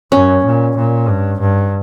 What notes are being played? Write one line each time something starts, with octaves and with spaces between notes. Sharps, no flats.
F#2 C#4
A#2
A#2
G2
G2